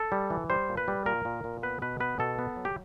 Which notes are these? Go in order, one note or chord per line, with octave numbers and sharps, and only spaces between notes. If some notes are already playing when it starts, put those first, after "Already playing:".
Already playing: A4
G3
E3
G3 C5
A#2
B4
G3
A#2 A#4
A#2
A#2
B3 B4
B2 B4
B3 B4
B2 A4
B3
F#3
G4